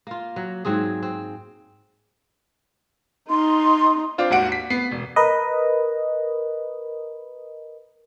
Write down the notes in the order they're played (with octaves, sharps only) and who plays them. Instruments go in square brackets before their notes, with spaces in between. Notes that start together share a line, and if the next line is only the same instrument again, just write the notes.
[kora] A#3 F4
F#3
G#2 F#3 C4 G#4
C4
[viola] D#4 [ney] C6
[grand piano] C4 D4 F4 C5
G#1 D#2 F#4 F#5 D7
B6
B3 C7
E1
[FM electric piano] A#4 B4 D#5